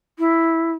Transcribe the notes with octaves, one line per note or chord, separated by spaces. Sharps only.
E4